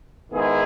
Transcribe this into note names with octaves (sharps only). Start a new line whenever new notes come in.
G#2 D#3 G#3 B3 E4 G#4